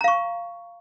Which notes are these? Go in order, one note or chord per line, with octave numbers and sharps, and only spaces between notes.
F5 A#5 C#6